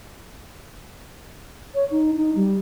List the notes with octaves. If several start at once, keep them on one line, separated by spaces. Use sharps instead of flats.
C#5
D#4
D#4
G3